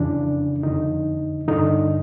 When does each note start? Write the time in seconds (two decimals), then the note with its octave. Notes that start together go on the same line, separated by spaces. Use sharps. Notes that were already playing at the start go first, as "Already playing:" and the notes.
Already playing: F2 C#3 E3 D4
0.63 F2 D3 D#4
1.48 G2 D3 D#4